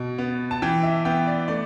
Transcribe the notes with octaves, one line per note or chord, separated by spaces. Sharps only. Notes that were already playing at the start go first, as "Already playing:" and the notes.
Already playing: B2
B3
A5
E3 G5
E5
B3 G5
D5
A3 D5